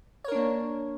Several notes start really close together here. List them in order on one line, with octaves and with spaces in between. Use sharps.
C#5 A#4 D4 A#3